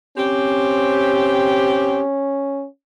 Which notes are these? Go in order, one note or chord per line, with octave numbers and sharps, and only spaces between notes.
C4 C#4 G4